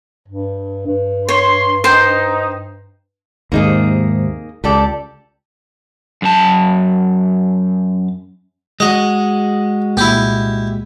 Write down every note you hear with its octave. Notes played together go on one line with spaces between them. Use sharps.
G2
G2
C#5 C6
D#4 C5 G5
D#2 G#2 C3 A#3 D#4 G#4
C#2 G4 A4 D5
F#2 A5
G#3 F#4 D#5
C2 A#2 E4 G4